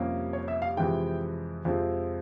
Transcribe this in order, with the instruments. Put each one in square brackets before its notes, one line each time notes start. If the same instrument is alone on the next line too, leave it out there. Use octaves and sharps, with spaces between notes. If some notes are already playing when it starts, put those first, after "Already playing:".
Already playing: [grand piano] F2 C3 G3 A#3 C#4
C#5
E5
F5
F2 C3 E3 G#3 G5
F2 C3 F3 G#3 C4